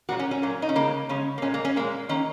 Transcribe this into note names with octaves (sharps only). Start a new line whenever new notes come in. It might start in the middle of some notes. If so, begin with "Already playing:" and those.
A#2 F#3 A#3 F#4
C#4
C#4
A#2 F#3 A#3
D#4
C#4
C#3 G#3 A#3
C#3 G#3 C#4
A#3
A#2 G#3 C#4
A#3
C#4
A#2 G#3 A#3
D#3 A#3 C#4